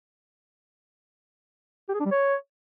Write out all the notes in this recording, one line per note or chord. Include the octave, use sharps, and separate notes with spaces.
G4
G#4
D4
G3
C#5